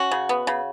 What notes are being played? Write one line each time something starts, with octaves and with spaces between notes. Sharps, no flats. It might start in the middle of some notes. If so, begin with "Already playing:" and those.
Already playing: C#4 F#4
C#3
B3
C#3